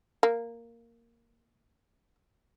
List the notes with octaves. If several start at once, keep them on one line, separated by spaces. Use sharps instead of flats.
A#3